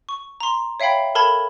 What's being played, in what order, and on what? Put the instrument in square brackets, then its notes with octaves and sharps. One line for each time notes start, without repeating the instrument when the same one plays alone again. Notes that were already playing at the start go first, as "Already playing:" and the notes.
[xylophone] C#6
A#5 C6
C#5 E5 F5 G5 B5
A4 A#4 A5 B5 G#6